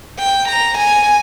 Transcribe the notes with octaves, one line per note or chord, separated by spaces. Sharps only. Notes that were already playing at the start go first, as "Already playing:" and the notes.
G5
A#5
G#5